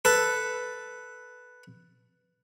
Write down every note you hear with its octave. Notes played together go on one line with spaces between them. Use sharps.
A4 B4